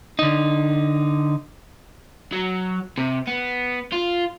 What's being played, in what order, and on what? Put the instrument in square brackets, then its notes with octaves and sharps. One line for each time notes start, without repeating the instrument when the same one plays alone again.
[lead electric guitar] D3 D#4
[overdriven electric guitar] F#3
C3
B3
F4